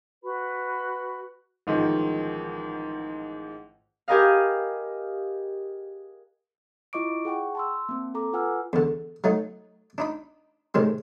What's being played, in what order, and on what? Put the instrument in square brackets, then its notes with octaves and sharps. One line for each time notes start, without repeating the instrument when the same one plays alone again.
[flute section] F#4 B4 B5
[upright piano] A1 G#2 D#3 F3
[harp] G4 G#4 A#4 B4 D#5 F5
[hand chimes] E4 F4 D#5 C#6 D6 D7
G#4 F#5 G5 C#6
A5 C6 E6
A#3 C4
A4 A#5 D6
F4 B4 F#5 G#5 E6 F6
[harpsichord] E2 D3
F#3 A3 D#4
D4 D#4 B5
A2 C3 D#3 G#3